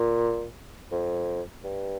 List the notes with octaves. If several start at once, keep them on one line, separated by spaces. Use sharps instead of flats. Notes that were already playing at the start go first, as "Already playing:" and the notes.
Already playing: A#2
F2
G2